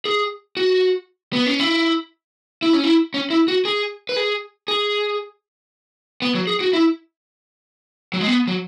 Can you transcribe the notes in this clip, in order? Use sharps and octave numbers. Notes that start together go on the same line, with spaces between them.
G#4
F#4
B3
C#4
E4
E4
C#4
E4
C#4
E4
F#4
G#4
B4
G#4
G#4
B3
F#3
G#4
F#4
E4
F#3
G#3
B3
F#3